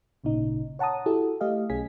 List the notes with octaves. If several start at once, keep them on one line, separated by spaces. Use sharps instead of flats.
G#1 A#2 C#3 D#4
C#5 F#5 A5 A#5 D#6
E4 F#4 G4 A4
A3 G4 D#5 F5
B1 C#4 G#4 G#5 B6